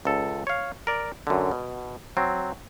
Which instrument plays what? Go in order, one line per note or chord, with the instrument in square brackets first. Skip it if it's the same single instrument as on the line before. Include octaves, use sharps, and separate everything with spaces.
[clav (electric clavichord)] C#2 A4
C#5 F5
A#4 D5
F#2 D3
B2
F#3 C4